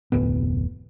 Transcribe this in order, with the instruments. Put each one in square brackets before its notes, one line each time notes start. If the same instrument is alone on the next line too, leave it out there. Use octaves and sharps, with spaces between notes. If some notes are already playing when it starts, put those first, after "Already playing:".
[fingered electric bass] F1 D2 A2 B3